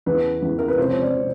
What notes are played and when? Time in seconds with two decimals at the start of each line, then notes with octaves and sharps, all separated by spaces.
0.06 E2 C#3 E3 B4
0.42 E2 C#3 E3
0.58 A#4
0.68 B4
0.78 C#2 C3 F3 C5
0.90 C#5
1.02 D5
1.15 C3 F3